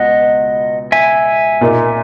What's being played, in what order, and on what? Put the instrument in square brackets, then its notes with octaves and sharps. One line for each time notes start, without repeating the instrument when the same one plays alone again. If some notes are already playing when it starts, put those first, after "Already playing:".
Already playing: [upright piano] C#2 B2 [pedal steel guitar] D#5 F#5
[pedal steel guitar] E5 G#5
[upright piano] A#2 A#3 D#4